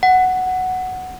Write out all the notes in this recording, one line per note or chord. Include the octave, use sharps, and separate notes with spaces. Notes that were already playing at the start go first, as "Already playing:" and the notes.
F#5